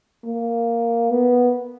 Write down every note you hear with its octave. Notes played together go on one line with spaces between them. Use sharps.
A#3
B3